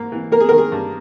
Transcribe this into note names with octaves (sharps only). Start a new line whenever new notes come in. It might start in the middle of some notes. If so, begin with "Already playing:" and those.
Already playing: G#2 A#3
E3
A#3 A#4
G#4
D#3 A#4
G#4
G2